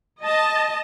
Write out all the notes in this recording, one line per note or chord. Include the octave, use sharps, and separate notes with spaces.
D#5 A5